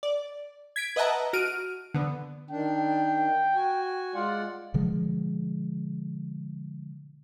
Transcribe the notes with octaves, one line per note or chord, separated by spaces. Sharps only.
D5
G#6 B6 D7
B4 D#5 E5 F#5 A5 A#5
F#4 F6 D7 D#7
D3 B3
D#3 D4 G5
F#4 G#5
G#3 F4 D5 F#5
B2 D3 F3 G#3